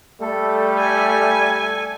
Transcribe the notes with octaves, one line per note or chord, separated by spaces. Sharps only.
G3 A3 A4
G#5